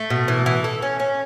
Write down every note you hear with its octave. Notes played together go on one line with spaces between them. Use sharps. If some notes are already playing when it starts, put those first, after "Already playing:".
Already playing: A3
B2
E3
E3
A4
C#4
C#4